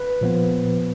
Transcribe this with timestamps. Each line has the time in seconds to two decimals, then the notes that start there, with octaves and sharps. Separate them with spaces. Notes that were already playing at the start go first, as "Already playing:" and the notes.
Already playing: B4
0.21 A#2 F3 B3